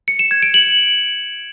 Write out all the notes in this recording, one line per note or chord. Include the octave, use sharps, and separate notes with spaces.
C#7
E7
G#6
D7
F#7